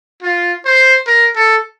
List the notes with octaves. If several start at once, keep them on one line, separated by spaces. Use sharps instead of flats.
F4
C5
A#4
A4